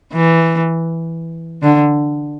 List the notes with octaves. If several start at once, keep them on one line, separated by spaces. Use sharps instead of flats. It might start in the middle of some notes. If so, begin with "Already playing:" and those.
E3
D3